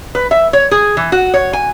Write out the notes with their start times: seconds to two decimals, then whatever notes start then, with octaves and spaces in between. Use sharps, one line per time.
0.15 B4
0.31 E5
0.53 C#5
0.71 G#4
0.97 E3
1.12 F#4
1.34 C#5
1.53 G#5